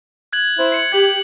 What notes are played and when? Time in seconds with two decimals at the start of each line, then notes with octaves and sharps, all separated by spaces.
0.33 F#6 G#6 F#7
0.58 E4 C5
0.72 C7 C#7 F#7
0.92 G4 G#6 F#7